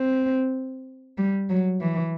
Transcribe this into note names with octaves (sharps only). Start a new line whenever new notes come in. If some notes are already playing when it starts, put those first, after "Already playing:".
Already playing: C4
G3
F#3
E3